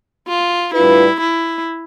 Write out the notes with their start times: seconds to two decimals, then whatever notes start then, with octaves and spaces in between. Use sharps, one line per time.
0.28 F4
0.74 A2 G3 D4 E4 F4 B4
1.21 E4